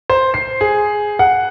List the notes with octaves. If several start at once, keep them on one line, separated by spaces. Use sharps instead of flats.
C5
C7
G#4
F#5